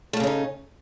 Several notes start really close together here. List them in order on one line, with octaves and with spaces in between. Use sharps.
A3 A#3 C#3 C#4 D#4